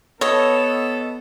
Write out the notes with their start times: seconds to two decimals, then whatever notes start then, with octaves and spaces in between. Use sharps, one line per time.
0.21 B3 A4 C#5 D#5